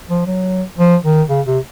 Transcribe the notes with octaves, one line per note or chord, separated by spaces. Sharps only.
F3
F#3
F3
D#3
C#3
C3